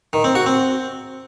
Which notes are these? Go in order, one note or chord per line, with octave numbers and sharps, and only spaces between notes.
D#3
C4
F#4
C4